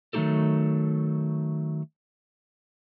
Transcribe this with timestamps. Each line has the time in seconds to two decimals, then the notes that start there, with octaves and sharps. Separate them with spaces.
0.13 D#3 F#3 A3 D#4 G4 A4